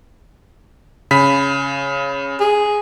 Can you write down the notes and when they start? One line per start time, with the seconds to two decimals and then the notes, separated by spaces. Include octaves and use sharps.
1.11 C#3 B5 B6
2.40 G#4